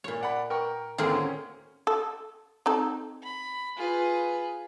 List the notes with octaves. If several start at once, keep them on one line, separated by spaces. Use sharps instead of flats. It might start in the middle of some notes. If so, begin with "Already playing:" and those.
A#2 C#5
D5 F#5 B5
A#4 G5 C#6
D2 A2 D#3 A#3 C4 G#4
C#4
A4
C4 D#4 A4
B5
F4 G#4 B4